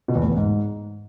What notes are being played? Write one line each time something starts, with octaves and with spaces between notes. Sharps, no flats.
B2
E2
A2
E2
G#2